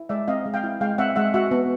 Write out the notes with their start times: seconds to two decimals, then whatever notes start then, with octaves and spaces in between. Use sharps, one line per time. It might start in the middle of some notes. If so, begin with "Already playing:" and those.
Already playing: E4
0.09 G#3 D5 E5
0.28 C4 D#5 F5
0.46 G#3
0.54 F5 G5
0.63 E4
0.81 G#3 F5 G5
0.98 C4 E5 F#5
1.16 G#3 E5 F#5
1.34 F#4 E5 F#5
1.51 B3